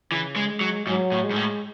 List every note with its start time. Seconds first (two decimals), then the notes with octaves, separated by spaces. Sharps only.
0.11 C#3 E3
0.36 G#3
0.49 G#3
0.61 F#3
0.87 G#2 F#3
1.12 A2
1.24 G#3
1.31 G#2
1.36 A2